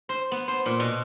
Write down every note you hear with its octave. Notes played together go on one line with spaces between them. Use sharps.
C5
B3
C5
A#2
B2